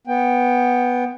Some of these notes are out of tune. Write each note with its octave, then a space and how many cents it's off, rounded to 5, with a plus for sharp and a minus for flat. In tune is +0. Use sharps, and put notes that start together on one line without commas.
B3 +0 G5 +15